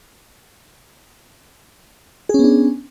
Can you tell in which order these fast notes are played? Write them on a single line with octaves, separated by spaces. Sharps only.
G#4 C#4 B3 D4